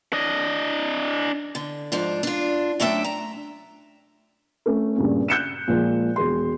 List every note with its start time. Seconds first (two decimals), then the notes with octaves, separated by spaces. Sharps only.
0.13 D4 D#5
1.55 D3
1.92 G#2 F3 D4
2.23 D4 F4
2.80 F#2 A3 D4 E5 G5
3.04 A#5
4.66 A3 C#4
4.96 G2 A#2 C#3
5.28 F#6 G6 C#7 E7
5.67 A#2 F3 G#3
6.16 E1 G#4 C6